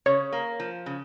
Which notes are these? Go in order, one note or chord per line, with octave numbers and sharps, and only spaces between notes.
C#3 C#5
A#3
F3
C#3